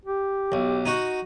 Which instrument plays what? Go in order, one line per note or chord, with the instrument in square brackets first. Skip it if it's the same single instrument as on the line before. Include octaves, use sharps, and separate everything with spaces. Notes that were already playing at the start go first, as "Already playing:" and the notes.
[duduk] G4
[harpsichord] B1
D#4 F#4